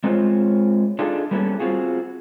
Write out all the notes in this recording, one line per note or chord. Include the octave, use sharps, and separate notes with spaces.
G#3 C4 F4 C5 C#5
D4 D#4 F4 G#4 A4
G3 A#3 B3 C#4 E4 A4
C4 F4 F#4 G#4